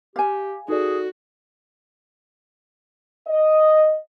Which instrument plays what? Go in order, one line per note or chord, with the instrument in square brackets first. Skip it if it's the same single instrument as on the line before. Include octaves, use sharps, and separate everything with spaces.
[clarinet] G4 [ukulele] F5 G#5
[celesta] D#4 A4 D5 [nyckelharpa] F#4 [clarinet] G#4
[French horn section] D#5